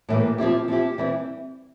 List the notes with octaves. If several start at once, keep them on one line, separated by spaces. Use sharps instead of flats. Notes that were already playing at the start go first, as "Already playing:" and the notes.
A2 E3 G3 A#3
F3 C4 E4 G4
F3 C4 E4 G4
E3 G3 C4 E4